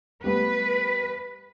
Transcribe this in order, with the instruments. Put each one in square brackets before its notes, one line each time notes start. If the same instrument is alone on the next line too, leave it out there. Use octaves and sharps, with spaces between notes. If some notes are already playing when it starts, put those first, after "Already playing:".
[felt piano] G3 A3 B3 [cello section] B4